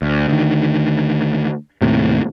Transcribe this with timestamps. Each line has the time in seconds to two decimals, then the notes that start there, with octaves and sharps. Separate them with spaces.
0.02 D2
0.28 D2 D#3
1.82 D#2 A2 C3